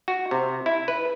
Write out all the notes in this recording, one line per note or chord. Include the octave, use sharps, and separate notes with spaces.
F#4
C3
E4
B4